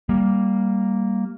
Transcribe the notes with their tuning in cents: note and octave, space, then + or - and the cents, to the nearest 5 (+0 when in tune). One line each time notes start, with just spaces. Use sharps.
G3 +0 A#3 +0